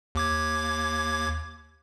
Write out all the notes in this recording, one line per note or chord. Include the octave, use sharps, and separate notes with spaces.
D#2 D6 G#6